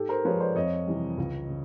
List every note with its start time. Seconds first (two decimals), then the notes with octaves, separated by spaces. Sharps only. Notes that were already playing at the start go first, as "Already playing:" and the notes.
Already playing: G#2 G4 A4
0.09 A#4 C5
0.25 F3 G#3 B4 C#5
0.40 C5 D5
0.55 F2 C#5 D#5
0.87 C3 E3 G3
1.17 C#2
1.49 C#3